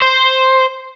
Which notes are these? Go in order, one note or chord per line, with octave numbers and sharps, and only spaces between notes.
C5